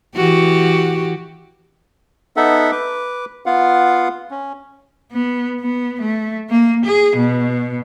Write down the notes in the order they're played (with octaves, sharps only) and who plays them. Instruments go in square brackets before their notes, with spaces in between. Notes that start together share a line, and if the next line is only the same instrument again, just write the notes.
[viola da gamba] E3 F#4 G4
[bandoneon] B3 D#4 A4 E5 F#5
B4 D6
B3 F4 F5 F#5
C#4
[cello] B3
B3
A3
A#3
G#4
B2